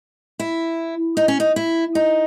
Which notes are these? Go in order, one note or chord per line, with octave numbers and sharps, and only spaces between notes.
E4
D#4
C#4
D#4
E4
D#4